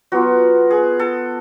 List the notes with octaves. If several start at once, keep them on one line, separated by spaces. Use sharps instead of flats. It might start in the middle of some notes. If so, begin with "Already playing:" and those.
F#3 B3 F4 F#4
G#4
A4